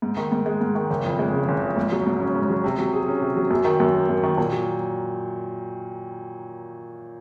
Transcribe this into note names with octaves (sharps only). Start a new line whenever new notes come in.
G#2
D#3
G#2
G#3
G#2
D#3
F#1
F2
G#3
C#3
F#1
F2
G#2
F#3
G#2
C#4
G#2
F#3
C3
F#3
G#4
C#4
C3
F#3
F#2
D#3
F#2
A#3
F#2
D#3
A#2
F#3